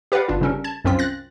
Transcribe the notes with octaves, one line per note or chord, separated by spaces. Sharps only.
G4 B4 D5 F5 F#5
G1 D4 F4
C#3 G3 C#4 A4 A#4
A5 G#6
C2 F#2 C4 C#4 F4 B6
F#6 A6 A#6